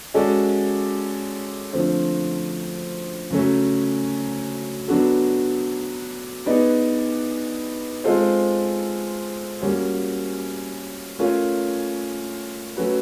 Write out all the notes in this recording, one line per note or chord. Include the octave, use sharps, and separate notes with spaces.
G#3 C#4 F#4 A4 D5
D3 F3 A3 C4
C#3 F#3 A3 C#4
F#3 B3 D4 F#4 A4
B3 D#4 G#4 B4 D5
G#3 C4 F4 A4 C5
G3 A#3 C#4 F#4
A3 C#4 F4 A#4 C#5
F#3 A3 C#4 F#4 B4